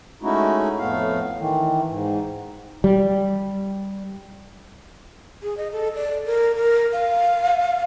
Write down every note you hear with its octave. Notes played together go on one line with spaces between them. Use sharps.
G#3 A3 C#4 D#4 E4 F#4
F2 A2 A3 B3 F5
D#3 E3
G#2
G3
G#4
D#5
A4
D5
A#4
A#4
F5